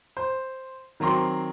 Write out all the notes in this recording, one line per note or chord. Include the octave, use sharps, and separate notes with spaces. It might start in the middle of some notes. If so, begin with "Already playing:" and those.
C5
D#3 F#3 C4 A#5 C6 D6